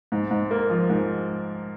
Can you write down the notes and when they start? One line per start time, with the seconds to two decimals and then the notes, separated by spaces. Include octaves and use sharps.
0.12 G#2
0.31 G#2
0.51 A#3
0.70 F3
0.89 G#2